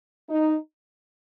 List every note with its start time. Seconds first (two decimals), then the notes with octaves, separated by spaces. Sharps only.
0.29 D#4